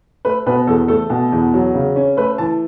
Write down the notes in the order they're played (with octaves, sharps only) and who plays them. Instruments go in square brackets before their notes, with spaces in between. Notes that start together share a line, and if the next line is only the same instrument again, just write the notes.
[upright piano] A3 B4
B2 B4
E2 A4
A3 A4
B2
E2
F#3
C#3
C#4
A3 B4
E3 A5